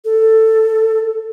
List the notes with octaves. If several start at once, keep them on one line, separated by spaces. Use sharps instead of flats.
A4